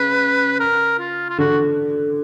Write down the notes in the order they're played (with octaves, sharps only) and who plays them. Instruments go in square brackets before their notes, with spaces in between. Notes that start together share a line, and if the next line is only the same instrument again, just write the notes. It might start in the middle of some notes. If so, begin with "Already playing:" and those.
Already playing: [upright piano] C#3 [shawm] B4
[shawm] A#4
F4
F4
[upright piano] D3 [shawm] F#4